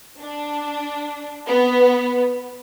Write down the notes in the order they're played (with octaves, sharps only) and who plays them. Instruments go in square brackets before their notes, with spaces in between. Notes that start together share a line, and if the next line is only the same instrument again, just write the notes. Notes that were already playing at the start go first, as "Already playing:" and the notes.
[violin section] D4
B3